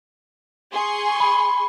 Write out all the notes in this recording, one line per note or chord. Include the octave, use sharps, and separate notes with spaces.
G#4 C6 C#6
B5